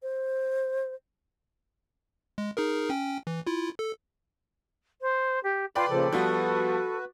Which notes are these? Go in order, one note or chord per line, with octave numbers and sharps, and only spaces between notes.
C5
G#3
D#4 G#4 A#4
C#4 G5
E3
E4 F4
A4
C5
G4
F4 B4 D5 G5
A#2 C#3 F3 A4
F3 G3 B3 F#4 B4